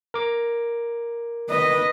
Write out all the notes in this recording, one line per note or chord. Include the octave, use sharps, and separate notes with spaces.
A#4 D6
B4 D#5